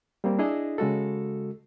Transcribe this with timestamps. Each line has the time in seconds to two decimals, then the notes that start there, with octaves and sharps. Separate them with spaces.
0.24 G3 A#3 C4
0.39 D4 E4 G#4 D#5
0.78 C#3 G#3 F#4 A4